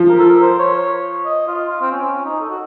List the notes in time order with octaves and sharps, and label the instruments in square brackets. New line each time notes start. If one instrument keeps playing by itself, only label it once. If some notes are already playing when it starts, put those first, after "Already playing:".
Already playing: [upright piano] F3
[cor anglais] A#4
A4
A#4
C5
C#5
D#5
F4
F4
C4
C#4
D#4
A4
F#4